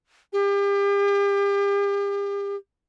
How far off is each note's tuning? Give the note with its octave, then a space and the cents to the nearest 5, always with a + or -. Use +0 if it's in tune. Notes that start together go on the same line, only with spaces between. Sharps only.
G4 +40